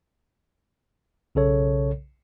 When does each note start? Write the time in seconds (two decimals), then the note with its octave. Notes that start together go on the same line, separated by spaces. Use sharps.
1.35 B1 C#3 A4 C#5